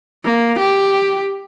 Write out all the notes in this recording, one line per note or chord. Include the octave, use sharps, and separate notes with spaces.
A#3
G4